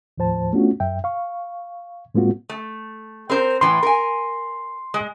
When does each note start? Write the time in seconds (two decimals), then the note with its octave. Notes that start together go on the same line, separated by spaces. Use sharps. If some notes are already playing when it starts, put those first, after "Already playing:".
0.18 D#2 A2 F3 C5 A5
0.53 A3 B3 C#4 D4 F4 F#4
0.80 F#2 E5 G5
1.04 F5 C#6
2.15 A2 G#3 A#3 C4 F4 F#4
2.50 A3
3.30 C4 A#4 C5
3.61 A2 E3 C6
3.83 A#4 G#5
4.94 G#3